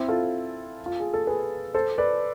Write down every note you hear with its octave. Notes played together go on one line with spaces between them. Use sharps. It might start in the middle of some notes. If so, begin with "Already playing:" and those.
Already playing: C4 E4
F4 A4
F4
G#4
A4
G#4 B4
A4 C5
B4 D5